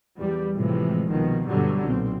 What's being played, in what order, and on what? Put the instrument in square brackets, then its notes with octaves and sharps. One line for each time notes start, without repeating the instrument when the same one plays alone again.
[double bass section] E2 G3
A2 C3 E3 F3 G#3
C2 B2 D#3 F3
G2 B2 D3 F#3 G3
B1 A#2 C4